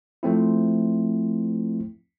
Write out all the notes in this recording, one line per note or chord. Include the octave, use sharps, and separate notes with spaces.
F3 A3 C4 E4